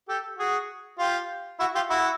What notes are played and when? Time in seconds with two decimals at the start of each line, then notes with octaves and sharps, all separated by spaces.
0.09 G4 A4
0.39 F#4 G#4
0.99 F4 G4
1.60 E4 F#4
1.75 F4 G4
1.90 E4 F#4